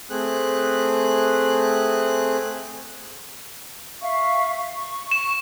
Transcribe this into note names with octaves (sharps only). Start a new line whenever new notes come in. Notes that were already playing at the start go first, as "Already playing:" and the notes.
A3 C4 G#4 F#6
E5 F5 C#6
C#6
E7